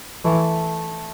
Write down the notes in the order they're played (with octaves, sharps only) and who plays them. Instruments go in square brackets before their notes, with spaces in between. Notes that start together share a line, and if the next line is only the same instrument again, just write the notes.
[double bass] E3 [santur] A3